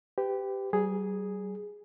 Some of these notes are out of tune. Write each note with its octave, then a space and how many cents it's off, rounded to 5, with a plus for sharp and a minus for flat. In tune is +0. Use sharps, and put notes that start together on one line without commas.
G4 +0 B4 +35
G3 -40 G#4 +0